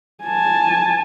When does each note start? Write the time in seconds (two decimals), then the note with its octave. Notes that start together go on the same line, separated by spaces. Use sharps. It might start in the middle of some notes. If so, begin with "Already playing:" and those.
0.24 G#5 A5